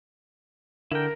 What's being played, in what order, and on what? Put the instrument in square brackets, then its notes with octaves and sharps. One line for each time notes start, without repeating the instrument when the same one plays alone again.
[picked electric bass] D3 [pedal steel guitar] E4 G5 [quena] A#4